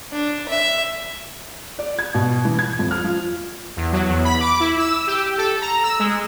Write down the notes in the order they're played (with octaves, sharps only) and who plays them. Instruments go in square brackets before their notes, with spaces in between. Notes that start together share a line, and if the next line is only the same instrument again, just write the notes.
[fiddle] D4
E5
[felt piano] D5
G#6
B2
E3
G#6
F2
F6
F3
[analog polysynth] E2
F#3
E2
B5
D6
E4
E6
G4
A4
A#5
E6
G#3